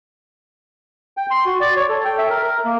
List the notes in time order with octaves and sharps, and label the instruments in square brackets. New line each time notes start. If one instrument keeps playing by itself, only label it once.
[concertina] G5
C6
F#4
D5
C#5
A4
G5
E5
A#4
A#4
A#3